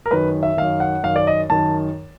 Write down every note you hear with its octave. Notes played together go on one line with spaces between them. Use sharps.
A#4
F#2 D#3 B4
E5
F#2 D#3 F5
F#5
F#2 D#3 F5
D5
D#5
F#2 D#3 A5